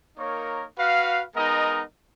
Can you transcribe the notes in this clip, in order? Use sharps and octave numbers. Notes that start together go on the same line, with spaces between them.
A#3 D#4 A#4 C#5
F#4 B4 F5
G#3 B3 D#4 A#4 D#5